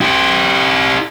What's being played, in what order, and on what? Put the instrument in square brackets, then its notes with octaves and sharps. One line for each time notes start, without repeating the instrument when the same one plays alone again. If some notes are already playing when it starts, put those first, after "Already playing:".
[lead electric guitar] E4 G4